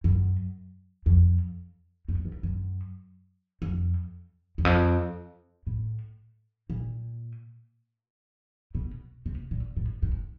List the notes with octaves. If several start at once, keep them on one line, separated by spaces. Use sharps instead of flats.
F#2
F2
F#2
G2
F#2
F2
E2
F2
A2
A#2
B2
C3
A#2
A2
G#2